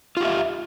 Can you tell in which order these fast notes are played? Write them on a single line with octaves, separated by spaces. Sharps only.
F4 G4 E5